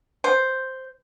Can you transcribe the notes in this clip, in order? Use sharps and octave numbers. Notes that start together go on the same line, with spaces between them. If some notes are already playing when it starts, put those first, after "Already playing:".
C5